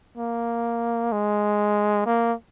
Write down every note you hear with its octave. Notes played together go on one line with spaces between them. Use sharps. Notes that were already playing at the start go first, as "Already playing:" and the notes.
A#3
G#3
A#3